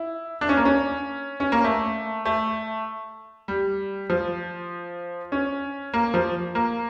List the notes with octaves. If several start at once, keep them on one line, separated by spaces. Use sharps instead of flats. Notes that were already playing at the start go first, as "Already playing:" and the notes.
Already playing: E4
D4
C#4
A#3
C#4
C#4
A#3
A3
A3
G3
F3
C#4
A#3
F3
A#3